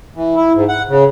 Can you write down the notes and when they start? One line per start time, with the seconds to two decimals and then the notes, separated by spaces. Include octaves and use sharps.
0.16 E3
0.35 E4
0.54 G#2
0.69 F#5
0.89 C#3